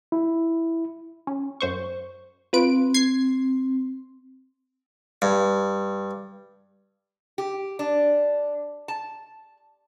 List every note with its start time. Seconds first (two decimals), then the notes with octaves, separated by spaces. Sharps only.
0.12 E4
1.27 C#4
1.61 F#2 C5 C#6
2.53 C4 F4 B4 D7
2.94 G#6 C7
5.22 G2
7.38 G4
7.79 D4
8.88 A5